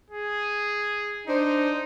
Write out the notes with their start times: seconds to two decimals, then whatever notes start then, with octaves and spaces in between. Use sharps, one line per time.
0.10 G#4
1.27 D4 D#4 C5